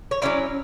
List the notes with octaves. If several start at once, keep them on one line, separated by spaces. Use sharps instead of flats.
C#5
F#3 C#4 E4 D5